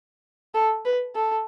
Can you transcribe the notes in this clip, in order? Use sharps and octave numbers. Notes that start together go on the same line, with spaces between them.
A4
B4
A4